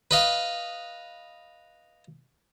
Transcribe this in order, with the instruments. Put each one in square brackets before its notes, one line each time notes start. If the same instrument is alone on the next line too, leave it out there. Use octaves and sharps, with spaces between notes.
[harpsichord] B4 D#5 F5